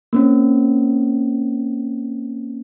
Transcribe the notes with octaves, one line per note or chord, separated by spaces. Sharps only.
A#3 C4 C#4